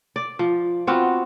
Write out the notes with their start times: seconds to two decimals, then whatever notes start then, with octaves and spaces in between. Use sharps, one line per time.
0.16 D5
0.39 F3
0.87 B3 C4 F4 F#4